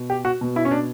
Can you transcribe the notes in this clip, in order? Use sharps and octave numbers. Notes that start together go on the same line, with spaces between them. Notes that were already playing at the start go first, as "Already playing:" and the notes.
Already playing: B2
G4
F#4
B2
E4
C#4
D4